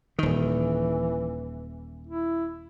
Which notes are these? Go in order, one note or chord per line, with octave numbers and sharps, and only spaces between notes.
D#1 D#3 E3
E4